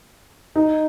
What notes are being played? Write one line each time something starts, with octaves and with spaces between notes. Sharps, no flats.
D#4